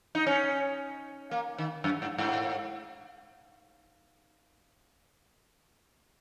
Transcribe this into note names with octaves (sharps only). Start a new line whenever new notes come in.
D#4
C#4
A#3
D#3
F#2
G#2
G#2